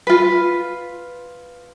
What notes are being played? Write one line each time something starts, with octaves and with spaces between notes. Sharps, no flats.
F4 B4